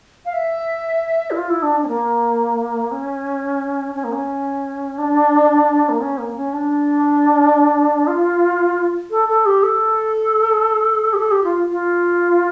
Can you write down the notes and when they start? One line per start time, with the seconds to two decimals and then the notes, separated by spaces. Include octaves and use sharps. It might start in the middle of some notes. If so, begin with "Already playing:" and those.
0.25 F5
0.33 E5
1.30 E4
1.36 F4
1.49 E4
1.62 D4
1.82 C#4
1.88 A#3
2.91 C#4
3.94 C#4
4.04 A#3
4.12 C#4
4.98 D4
5.89 A#3
6.00 C#4
6.18 A#3
6.36 C#4
6.52 D4
8.07 F4
9.10 A4
9.28 A4
9.45 G4
9.63 A4
11.13 G4
11.18 A4
11.31 G4
11.43 F4
11.70 F4